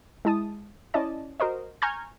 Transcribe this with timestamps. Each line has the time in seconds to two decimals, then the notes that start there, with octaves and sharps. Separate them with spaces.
0.25 G#3 E4 A5 D#6
0.94 C#4 E4 D5 D#5 A5
1.40 F#4 A#4 C5 D#5
1.82 G#5 A#5 C#6 F6 G6 G#6